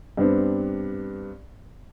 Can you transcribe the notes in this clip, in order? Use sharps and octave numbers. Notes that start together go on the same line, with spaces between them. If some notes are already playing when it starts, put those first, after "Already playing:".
G2 B3 C4 D4